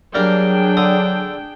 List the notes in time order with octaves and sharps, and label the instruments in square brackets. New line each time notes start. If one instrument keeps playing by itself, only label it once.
[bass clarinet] F#3 [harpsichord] G3 A#3 F5 [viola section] D4 G#4 G5
[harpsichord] D3 D#6